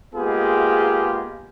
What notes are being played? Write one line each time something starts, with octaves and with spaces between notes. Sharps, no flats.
G#3 A#3 B3 F4 G4 G#4